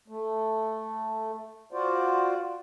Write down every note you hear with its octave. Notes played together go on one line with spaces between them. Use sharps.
A3
F4 F#4 C5 D5